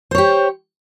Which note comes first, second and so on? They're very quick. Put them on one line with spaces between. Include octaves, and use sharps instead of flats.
C5 C#5 G4